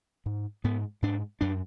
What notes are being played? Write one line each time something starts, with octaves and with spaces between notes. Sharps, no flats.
G#2
G#2 B3
G#2 D4
F#2 D4